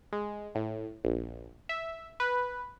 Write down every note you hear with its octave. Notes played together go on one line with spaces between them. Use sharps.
G#3
A2
A#1
E5
B4